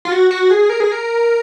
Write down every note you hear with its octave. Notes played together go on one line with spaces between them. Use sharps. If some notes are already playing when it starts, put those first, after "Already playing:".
F4
F#4
F#4
G#4
A#4
G#4
A#4